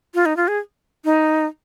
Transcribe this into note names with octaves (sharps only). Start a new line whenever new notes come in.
F4
D#4
F4
G#4
D#4